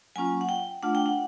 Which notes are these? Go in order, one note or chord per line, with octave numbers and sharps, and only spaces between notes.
F#3 A#3 C#4 F4 G#5
F#5
G5
A3 D4 F4 F#5
G5
F#5